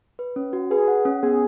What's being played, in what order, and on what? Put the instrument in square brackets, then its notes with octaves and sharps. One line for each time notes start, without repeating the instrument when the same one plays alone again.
[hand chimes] B4
C#4
F#4
[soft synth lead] G#4 [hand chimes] B4
[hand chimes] F#5
C#4
[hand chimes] B3 [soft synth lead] G#4